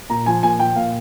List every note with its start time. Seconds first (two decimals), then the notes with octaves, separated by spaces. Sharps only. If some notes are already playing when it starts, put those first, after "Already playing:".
0.10 A#2 A#5
0.26 F3 G#5
0.43 A#2 G#5
0.59 F3 G5
0.76 A#2 F5